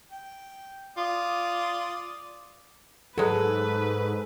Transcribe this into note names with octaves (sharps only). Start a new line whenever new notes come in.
G5
F4 D5 D#6
G#2 F#3 G#3 A4 B4